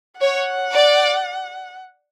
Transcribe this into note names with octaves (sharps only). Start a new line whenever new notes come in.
C#5 F#5
D5